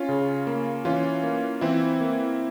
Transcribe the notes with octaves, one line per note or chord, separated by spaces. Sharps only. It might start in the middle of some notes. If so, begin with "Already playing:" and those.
Already playing: C#4 F4
C#3
A#3
E3 C#4 F4
A#3
E3 C4 E4
A#3